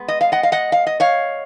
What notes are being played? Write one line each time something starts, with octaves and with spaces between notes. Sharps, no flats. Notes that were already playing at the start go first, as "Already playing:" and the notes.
Already playing: G#3 B3
D#5
F5
D#5 F#5
F5
D#5 F#5
F5
D#5
C#5 F5